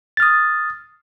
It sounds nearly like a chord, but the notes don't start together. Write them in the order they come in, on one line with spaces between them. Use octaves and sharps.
A6 F6 D#6